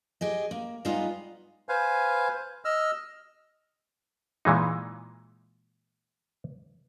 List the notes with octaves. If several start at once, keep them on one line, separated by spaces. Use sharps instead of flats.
G4 G#4 D#5
A#3
G3 G#3 B3 D#4 F4
B4 C5 F5 G#5
D#5 E6 F6
A#2 E3 G#3 D#4